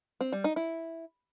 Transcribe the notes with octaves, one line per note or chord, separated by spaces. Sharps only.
C4
G3
D#4
E4